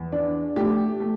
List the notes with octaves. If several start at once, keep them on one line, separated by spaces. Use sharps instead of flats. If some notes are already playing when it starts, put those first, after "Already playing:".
Already playing: E2
D4
A3 G4
A3